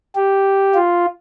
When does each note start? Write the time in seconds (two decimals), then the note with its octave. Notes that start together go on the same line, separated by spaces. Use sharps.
0.16 G4
0.75 F4